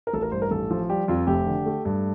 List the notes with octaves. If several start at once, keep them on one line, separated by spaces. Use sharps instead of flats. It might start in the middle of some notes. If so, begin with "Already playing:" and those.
A#4
A1 A4
A#4
G2 C5
A#4
A1 A4
F3
G3 G4
F2 F4
F1 G4
D3
A3
G2